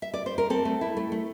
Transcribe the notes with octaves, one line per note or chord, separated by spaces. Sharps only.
E5
D5
C5
A#4
C4 A4
A3
E4
A3
A3